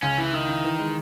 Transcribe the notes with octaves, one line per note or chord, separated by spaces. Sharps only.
C#2 C#4
E3 E4
D#3 E4
E4
E3
G#3